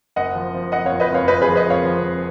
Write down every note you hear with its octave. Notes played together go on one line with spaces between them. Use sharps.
F#1 D#5 F#5
F3
F3
F#1 D#5 F#5
C#5 F5
F2
B4 D#5
F#1 C#5 F5
F2 B4 D#5
G#4 B4
F3
B4 D#5
F2 C#5 F5
F3
F3